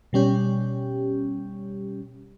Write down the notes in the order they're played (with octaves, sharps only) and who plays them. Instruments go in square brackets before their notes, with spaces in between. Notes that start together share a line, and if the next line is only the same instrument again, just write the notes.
[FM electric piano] B2 G3 C#4 G4